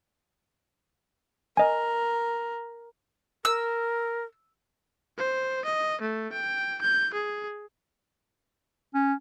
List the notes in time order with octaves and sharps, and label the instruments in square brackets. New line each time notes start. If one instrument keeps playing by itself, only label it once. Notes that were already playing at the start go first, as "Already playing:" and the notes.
[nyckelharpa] A#4 [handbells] D#5 G#5
[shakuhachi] A#4 [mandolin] E6
[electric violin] C5
D#5
A3
G5
G6
G#4
[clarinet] C#4